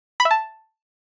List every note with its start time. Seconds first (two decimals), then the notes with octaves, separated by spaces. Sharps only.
0.20 B5
0.25 E5
0.31 A5